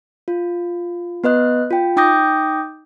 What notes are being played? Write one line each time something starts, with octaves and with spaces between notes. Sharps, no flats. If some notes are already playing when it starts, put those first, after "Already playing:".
F4
B3 B4 D#5 F#6
F4 G5
D#4 G5 D6 D#6 G6 A#6